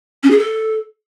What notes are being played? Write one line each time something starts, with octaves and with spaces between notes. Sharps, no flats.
C#4
G#4
A4